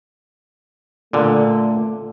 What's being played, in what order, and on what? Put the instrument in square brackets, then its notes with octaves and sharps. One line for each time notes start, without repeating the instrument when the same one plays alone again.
[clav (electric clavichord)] A#2 D3 [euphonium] A3